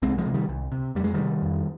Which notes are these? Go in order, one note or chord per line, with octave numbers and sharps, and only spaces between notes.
C2 G#3 C4
F3 G#3
C3
D#3 G3
C2
C3
F2 G3
G#3
C3 D#3 G3
F2